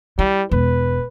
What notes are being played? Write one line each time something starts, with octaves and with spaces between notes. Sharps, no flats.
G3 E4
E1 B4